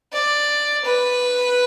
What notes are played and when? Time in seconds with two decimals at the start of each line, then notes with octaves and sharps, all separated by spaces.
0.13 D5
0.84 B4